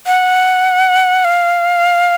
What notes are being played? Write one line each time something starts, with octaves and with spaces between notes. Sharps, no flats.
F#5
F5